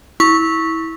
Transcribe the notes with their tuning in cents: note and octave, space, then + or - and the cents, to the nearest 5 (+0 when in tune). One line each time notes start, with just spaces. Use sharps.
E4 -20 C#6 +0